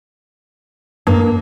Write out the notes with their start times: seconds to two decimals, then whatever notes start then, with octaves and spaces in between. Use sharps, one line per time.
1.07 G2 A#3